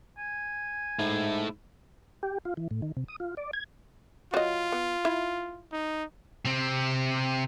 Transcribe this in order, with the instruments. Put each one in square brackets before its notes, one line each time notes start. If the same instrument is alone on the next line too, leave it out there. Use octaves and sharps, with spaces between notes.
[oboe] G#5
[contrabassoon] G#2 [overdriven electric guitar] A3 E4
[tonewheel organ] G4
F4
E3
A2
D#3
C3
D#6
F4
D5
G#6
[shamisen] F#3 D#5 [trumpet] F4
[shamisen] B3
E4 E5
[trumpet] D#4
[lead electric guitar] C3 C4